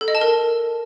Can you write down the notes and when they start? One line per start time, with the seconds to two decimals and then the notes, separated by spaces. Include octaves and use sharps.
0.01 A4
0.08 D#5
0.15 A5
0.21 A#4